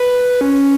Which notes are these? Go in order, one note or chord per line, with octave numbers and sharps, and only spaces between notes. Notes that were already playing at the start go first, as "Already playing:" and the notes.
Already playing: B4
C#4